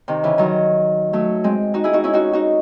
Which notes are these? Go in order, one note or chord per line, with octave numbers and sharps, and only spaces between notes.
C3 D#3
C#3 E3
D#3 F#3
F#3 A3
G#3 C4
D#4 F#4
E4 G#4
D#4 F#4
C#4 E4
D#4 F#4
D#4 F#4